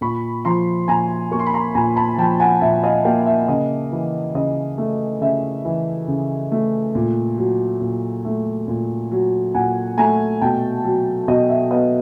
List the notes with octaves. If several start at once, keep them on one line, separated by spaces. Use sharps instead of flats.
A#2 B5 C#6
F3 A#5 C6
A#2 G#5 A#5
A#3 C#6
C6
B5
A#5 C6
A#2 G#5 A#5
A5 B5
F3 G5 A5
F#5 G#5
A#2 E5
D#5 F5
A#3 F5 G5
E5
C#3 D#5
E3
C#3 D#5
A3
C#3 E5
E3
C#3
A3
A#2
F#3
A#2
A3
A#2
F#3
A#2 F#5 G#5
A3 G#5 A#5
B2 G5 A5
F#3
B2 D#5
E5
B3 D#5 F5